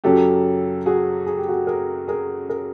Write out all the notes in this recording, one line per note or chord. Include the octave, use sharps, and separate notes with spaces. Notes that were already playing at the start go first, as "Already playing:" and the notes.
F#2 C#3 F#3 G4 A4
F#4 G#4
G#4
G4
F#4 G#4
G#4 A#4
G#4 A#4
G#4 A#4